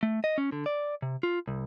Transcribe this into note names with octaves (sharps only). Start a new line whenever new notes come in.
A3
D#5
C#4
D3
D5
C3
F4
C2